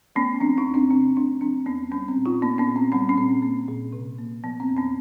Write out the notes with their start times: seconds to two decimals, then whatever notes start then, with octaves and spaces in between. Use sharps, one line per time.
0.16 A3 B3 C#4
0.40 F3 C4 D4
0.58 C#4 D#4
0.65 E2
0.74 C4 D4
0.91 C3 C4 D4
1.16 A3 C4 D4
1.41 F3 C4 D4
1.66 E2 B3 C#4
1.91 G3 B3 C#4
2.08 C4
2.17 A#2
2.26 D#4 F4
2.42 A#3 B3 C#4
2.58 B3 C#4
2.67 A#2
2.76 C4
2.92 G3 B3 C#4
3.09 C#4
3.17 A#2 C4
3.42 A#3
3.68 A#2
3.93 C3
4.19 A#3
4.43 F3 B3
4.60 C4
4.69 E2
4.77 B3 C#4